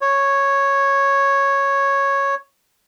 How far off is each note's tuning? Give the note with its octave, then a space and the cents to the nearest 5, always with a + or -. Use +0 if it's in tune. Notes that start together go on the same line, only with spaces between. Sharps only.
C#5 -5